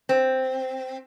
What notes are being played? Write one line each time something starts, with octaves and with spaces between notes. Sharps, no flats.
C4